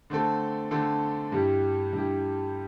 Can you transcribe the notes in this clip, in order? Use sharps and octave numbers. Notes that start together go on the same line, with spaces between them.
D3 A3 C4 A4
D3 A3 C4 A4
G2 G3 E4 G4
G2 G3 E4 G4